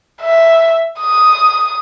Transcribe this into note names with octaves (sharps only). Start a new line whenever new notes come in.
E5
D#6